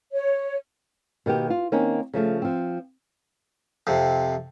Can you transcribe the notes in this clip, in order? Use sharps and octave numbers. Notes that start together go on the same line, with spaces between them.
C#5
B2 D#3 A#3 G4
F4
D#3 A#3 C4 C#4 D#4
C#3 F3 A3
F3 C4
F2 C3